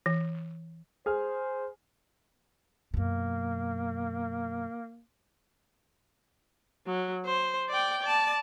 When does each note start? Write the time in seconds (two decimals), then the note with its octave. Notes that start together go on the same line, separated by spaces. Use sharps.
0.06 E3
1.06 G#4 C5 F6
2.94 F#2 B2 A#3
6.86 F#3
7.25 C5
7.69 D5 G5
8.03 D5 A5